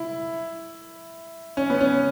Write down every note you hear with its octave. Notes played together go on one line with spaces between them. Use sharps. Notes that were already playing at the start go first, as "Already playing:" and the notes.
Already playing: E4
C#4
B3
C#4